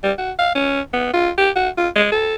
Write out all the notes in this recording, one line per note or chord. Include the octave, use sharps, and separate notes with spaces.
G3
F#4
F5
C#4
B3
F4
G4
F#4
F4
G#3
A4